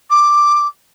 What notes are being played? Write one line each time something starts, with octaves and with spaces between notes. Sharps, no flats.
D6